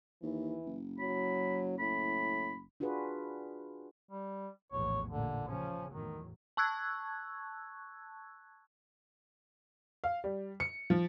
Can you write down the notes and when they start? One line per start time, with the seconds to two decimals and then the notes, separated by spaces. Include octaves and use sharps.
0.23 D#2 E3
0.66 F#1
0.99 F#3 B5
1.79 A2 B5
2.80 D4 F4 F#4 G#4 B4
4.11 G3
4.72 A#1 E2 A2 C#5
5.09 A1 A#2 D3
5.48 C#3 F3 C#4
5.92 E2 A2 D#3 F#3
6.57 A5 C#6 E6 F#6 G#6
10.04 F5
10.24 G3
10.60 C#7
10.90 F3